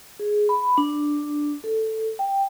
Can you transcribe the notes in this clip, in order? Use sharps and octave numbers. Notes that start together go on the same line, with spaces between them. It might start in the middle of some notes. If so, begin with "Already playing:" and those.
G#4
B5
D4
A4
G5